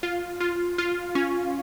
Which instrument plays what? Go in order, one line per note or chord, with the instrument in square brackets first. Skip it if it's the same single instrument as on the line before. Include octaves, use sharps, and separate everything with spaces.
[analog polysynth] F4
F4
F4
C#4